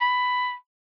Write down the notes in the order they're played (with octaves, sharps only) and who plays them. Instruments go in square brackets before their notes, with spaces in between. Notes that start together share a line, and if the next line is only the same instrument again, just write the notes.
[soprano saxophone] B5